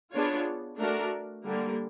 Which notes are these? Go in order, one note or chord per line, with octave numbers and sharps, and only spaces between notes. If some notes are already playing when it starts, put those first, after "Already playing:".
B3 D4 F4 G#4 C#5
A3 D4 F#4 A#4
D3 G3 A#3